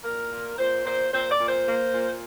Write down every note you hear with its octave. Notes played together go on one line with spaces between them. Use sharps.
A#2 A#4
A#2
A#2 C5
A#2 C5
A#2 C5
D5
A#2
C5
A#3
A#2